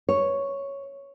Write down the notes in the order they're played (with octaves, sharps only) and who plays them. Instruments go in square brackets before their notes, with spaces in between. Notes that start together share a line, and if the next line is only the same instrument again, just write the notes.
[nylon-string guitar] C#5